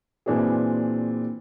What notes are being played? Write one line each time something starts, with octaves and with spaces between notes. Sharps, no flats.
A#2 E3 C4 D4 F#4 G#4